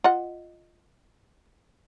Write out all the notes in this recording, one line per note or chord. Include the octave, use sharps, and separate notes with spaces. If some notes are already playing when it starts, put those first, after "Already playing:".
F4 D#5 F#5